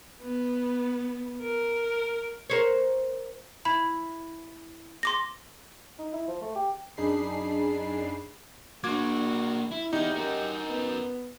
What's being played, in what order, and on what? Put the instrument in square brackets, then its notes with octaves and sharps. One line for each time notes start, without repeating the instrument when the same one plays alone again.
[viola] B3
A#4
[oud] A#4 C5 C#5
[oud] E4 [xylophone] B5
[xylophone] C6 D6 A#6
[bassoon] D#4
E4
F3
A3
G4
[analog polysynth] F#2 D4 D#4 G#4 B5 C7
[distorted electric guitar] A#3 D4 [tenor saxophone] F#4 [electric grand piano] D6 G#6
[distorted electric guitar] E4
[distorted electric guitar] B3 E4 [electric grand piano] D#4 [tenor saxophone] G4
[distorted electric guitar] F#4 A#4
[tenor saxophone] B3